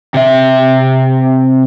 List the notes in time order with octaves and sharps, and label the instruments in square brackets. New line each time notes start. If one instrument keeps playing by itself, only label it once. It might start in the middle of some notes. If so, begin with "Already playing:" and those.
[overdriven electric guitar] C3 E5